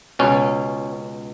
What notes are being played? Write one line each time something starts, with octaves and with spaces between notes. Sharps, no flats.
C#2 B2 C#4